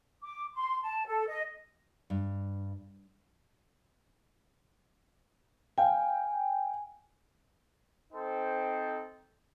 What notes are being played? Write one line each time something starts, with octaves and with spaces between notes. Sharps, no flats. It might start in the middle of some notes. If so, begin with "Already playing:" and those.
D6
C6
A5
A4
D#5
G2
F5 G5 G#5
C4 D#4 A4 C5 G5